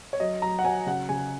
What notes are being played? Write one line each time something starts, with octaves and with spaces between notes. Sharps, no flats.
C#5
F#3 D#5
F#3 A#5
F#5
F#3 G#5
C#3 F#5
C#3 G#5